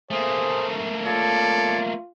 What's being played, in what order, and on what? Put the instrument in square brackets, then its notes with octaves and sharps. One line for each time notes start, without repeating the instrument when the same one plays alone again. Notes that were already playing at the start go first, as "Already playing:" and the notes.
[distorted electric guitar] A3 A#3 [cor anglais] G#4 [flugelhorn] C5
[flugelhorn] F4 [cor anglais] A4 [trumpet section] C#5 D5